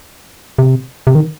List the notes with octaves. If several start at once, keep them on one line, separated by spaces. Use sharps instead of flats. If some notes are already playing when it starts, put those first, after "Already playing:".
C3
C3
D#3